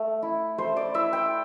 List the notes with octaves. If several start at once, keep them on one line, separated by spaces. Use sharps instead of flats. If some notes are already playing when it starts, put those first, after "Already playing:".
Already playing: A3
E4
A3 C5
D5
E4 E5
G5